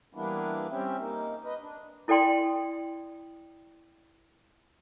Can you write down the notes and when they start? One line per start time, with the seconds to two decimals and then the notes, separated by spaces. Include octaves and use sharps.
0.15 E3 G3 A#3 B3 D4 E4
0.70 G3 C4 C#4 G4 E5
0.99 A#3 D#4
1.44 B4 D#5
1.60 D4
2.08 E4 A4 D5 G5 C6